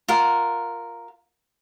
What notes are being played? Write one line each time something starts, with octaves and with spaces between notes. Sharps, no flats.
F4 A#4 F#5